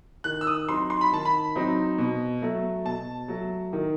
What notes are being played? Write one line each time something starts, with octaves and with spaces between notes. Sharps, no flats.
D#3 F#6
E6
D#6
F#3 C4 D#4 C6
C6
B5
D#3 A5
B5
F#3 C4 D#4
B2
F#3 A3
B2 A5
F#3 A3
D#3